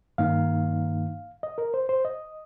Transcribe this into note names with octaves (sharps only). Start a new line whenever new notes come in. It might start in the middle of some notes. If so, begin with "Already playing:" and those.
G2 D#3 A#3 D#4 F5
D#5
A#4
C5
C5
D#5